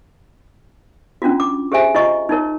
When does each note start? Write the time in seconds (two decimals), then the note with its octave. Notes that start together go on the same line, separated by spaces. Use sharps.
1.22 C#4 D4 F4 F#4
1.40 D6
1.72 G4 G#4 C5 E5 G#5
1.95 E4 F4 D#5 C#6
2.29 D#4 E4 A#4 C#5